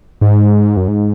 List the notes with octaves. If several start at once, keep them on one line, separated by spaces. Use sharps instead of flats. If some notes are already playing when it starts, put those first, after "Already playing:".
G#2
F#2
G#2